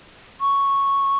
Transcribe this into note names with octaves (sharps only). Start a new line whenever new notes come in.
C#6